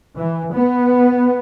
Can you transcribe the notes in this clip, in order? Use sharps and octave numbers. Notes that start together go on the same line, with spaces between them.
E3
B3